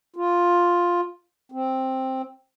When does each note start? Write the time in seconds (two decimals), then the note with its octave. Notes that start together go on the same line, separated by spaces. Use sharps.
0.16 F4
1.52 C4